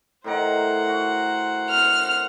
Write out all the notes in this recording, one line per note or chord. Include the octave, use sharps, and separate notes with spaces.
A2 D#3 A#4 C5 F#5
F#4
F6